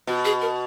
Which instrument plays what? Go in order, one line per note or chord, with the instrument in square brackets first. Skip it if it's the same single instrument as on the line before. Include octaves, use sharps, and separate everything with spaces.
[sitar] B2 [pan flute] F#4
[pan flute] G#4
A#4